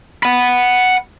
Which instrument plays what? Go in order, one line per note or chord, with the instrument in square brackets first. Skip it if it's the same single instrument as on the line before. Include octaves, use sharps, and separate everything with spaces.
[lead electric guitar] F#5 B5